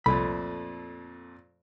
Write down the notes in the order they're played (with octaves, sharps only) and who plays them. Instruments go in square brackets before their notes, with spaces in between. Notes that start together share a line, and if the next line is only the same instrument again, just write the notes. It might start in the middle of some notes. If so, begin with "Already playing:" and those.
[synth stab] C2 [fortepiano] F2 A#2 A3 [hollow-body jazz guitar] B5